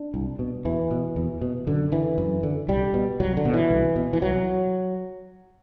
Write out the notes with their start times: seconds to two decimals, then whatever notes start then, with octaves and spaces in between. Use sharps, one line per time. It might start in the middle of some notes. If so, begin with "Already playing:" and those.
Already playing: D4
0.14 C2
0.39 B2
0.65 E2 E3
0.91 B2
1.16 E2
1.41 B2
1.67 F#2 D3
1.92 D3 E3
2.18 F#2
2.43 D3
2.68 C2 G3
2.94 B2
3.20 C2 F#3
3.37 D3
3.45 B2
3.54 E3
3.70 C2
3.96 B2
4.13 E3
4.21 C2 F#3